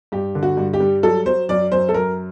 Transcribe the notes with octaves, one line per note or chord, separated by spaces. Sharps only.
G2 G4
D3
F#4
G2
G4
G3
F#3 A4
F#3 C5
F#2 D5
F#2 C5
A4
F#2 A#4